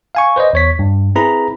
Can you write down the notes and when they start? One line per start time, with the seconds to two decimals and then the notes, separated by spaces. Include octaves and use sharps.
0.15 F5 G#5 C#6
0.36 B4 C5 D5 D#5
0.53 E2 C#5 B6
0.79 G2
1.15 C4 E4 G#4 B4 A#5 B5